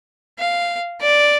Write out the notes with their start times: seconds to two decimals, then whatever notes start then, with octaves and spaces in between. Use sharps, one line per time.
0.38 F5
1.01 D5